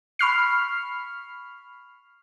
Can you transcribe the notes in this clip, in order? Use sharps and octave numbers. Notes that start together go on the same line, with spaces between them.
B5 C#6 F6 C7